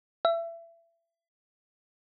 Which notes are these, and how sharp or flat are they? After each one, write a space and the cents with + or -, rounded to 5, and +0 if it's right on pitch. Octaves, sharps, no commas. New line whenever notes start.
E5 +30